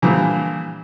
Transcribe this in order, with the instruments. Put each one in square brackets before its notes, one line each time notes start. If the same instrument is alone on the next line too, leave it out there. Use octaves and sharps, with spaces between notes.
[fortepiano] A#2 D3 E3 F3 G3